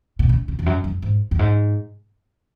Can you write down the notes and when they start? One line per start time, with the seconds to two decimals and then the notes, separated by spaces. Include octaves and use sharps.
0.19 B2
0.29 C#3
0.48 C#3
0.59 E2
0.66 F#2
0.84 F#2
1.02 G#2
1.31 F#2
1.39 G#2